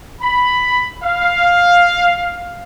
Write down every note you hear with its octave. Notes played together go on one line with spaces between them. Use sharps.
B5
F5